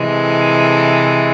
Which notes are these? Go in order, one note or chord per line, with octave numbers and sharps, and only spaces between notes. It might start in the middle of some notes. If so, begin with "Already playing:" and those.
Already playing: C3 E3 G#3
A4